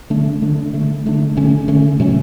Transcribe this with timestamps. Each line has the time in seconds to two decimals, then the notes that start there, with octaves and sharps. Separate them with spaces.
0.10 D3 A3 D4
0.42 D3 A3 D4
0.73 D3 A3 D4
1.06 D3 A3 D4
1.37 D3 A3 C#4
1.68 D3 A3 C#4
2.00 B2 F#3 A3 C#4